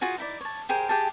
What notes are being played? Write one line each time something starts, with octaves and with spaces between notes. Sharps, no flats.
F4 F#4 G#4 G#5
D#4 E4 D5
C#5 A5
G4 G#4 A#4 C5
G4 G#4 G5 A5